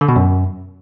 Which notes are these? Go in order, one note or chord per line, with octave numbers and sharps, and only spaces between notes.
D3
B2
F#2